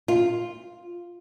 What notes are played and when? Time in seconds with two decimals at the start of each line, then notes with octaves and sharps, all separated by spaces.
0.08 F4